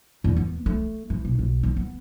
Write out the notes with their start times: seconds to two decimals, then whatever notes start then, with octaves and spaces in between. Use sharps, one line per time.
0.24 E2
0.37 B3
0.66 A3
1.10 E3
1.25 B1
1.39 B1
1.63 D#3
1.77 B3